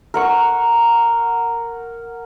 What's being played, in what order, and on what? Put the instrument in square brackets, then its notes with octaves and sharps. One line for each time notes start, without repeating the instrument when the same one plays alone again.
[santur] A#4 F#5 C#6